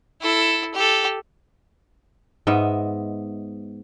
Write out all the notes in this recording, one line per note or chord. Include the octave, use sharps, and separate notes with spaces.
E4 A4
G4 A4
G#2 B3 D#5 E5